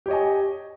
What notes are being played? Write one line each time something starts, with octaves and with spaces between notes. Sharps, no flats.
G4 C#5 D#5 G#5